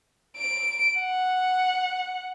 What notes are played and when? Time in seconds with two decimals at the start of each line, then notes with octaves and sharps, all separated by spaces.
0.37 D7
0.98 F#5